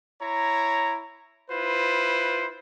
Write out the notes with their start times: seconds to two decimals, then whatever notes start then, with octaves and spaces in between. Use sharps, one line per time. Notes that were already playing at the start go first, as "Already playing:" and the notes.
0.21 E4 C#5 A#5
1.50 E4 F4 B4 C5